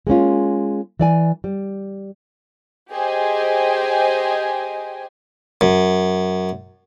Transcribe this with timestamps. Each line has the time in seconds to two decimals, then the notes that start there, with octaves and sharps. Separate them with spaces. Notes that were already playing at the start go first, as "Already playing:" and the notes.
0.07 G#3 A#3 C#4 F4
0.99 E3 D5 G#5
1.44 G3
2.91 G4 G#4 C5 D#5 G5 G#5
5.61 F#2